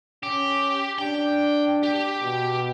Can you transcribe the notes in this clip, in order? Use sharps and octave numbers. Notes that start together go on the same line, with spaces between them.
C#4 G4
D4 G5
G4
B2